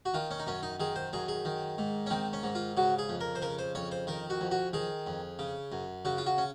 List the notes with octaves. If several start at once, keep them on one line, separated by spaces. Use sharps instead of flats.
F#4
D#3 F4
C#4
D#4
F#2 C#4
D#4
D#3 G#4
C5
F#2 G#4
G#4
D#3
G#2
C#4
D#3 C4
C#4
G#2
F4
C#3 F#4
G#4
F2
A#4
C5
C#3 A#4
C5
F2 C#5
C5
D#3 A#4
F#4
F2
F#4
D#3 G#4
F2
C#3
F#2
C#3 F#4
F4
F#4
C#4